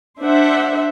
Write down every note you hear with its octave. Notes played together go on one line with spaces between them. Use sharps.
D4 C5 E5 F#5